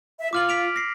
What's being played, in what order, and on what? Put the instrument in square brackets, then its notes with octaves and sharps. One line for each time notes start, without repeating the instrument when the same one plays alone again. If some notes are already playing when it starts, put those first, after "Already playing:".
[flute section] E5
[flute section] F4 [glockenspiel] D6 F6 F#7
[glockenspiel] B6 D7 F7
A#6 C7